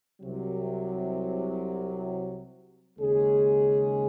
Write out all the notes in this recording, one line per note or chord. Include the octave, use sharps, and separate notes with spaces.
C2 C3 F#3
D#2 C#3 G#3 C#4 G#4